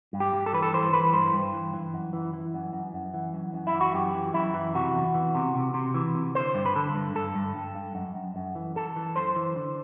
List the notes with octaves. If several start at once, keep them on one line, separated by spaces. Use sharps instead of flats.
G2
G4
G2
A4
E3 B4
A4
E3 C5
E3 B4
G2 C5
G2
E3
E3
F#2
E3
E3
F#2
F#2
F#2
E3
F#2
F#2
E4
E3
F#4
F#2 G4
E3
F#2 E4
E3
C3 F#4
E2
E3
C3
C3
C3
E3
C3
D3 C5
G2
B4
D3 A4
G2
G2 A4
G2
G2
G2
F#2
F#2
F#2
E3
E3 A4
E3
F#2 C5
E3
D3